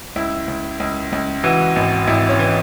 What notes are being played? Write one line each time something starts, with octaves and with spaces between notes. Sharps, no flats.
C#2 E4
C#2
C#2
C#2
E3 F#4
G#1
G#1 E4
C#4
E3